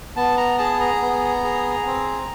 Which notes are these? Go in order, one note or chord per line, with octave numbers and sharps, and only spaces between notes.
B3 A5
A#5
G#4 A5
A#5
B3
G#4
C4